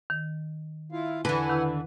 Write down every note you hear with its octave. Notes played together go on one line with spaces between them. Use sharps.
D#3
E4 F4 F5
E2 D3 E3 B4 F#5 G#5
D#3 E4 E6